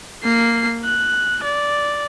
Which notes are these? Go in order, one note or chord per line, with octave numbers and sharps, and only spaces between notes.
A#3 C7
F#6
D5